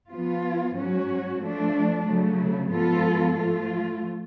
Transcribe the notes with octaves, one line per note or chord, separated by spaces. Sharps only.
F3 B3 F4
G#2 F#3 C#4 F#4
F3 A3 D4
C#3 F#3 A3
G#2 F3 B3 F4 A4
F3 A3 F4